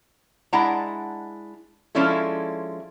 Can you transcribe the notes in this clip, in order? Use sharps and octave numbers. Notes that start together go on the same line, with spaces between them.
G#3 D4 E4 F#5 A5 A#5
F3 G#3 C#4 D4 E4 A4